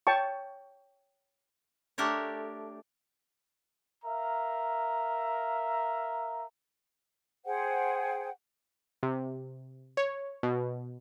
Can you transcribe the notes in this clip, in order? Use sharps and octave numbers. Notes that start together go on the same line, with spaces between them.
C#5 G5 A5 C#6
A3 D4 G4 A#4 C#5
A#4 E5 F5 A#5
G#4 C5 F#5 G5
C3
C#5
B2